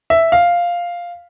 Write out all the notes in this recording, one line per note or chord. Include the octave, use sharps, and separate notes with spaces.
E5
F5